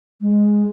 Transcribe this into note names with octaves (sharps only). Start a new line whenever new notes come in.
G#3